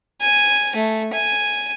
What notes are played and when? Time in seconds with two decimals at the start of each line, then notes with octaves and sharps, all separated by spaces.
0.21 G#5
0.76 A3
1.13 G#5